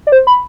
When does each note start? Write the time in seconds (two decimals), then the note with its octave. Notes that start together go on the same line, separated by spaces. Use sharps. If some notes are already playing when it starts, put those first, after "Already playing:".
0.07 D5
0.12 C5
0.27 B5